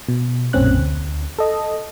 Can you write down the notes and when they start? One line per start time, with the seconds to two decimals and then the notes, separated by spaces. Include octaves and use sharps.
0.09 B2
0.53 B1 F#2 A#2 C4 C#4 F#6
0.76 D2
1.39 A4 D#5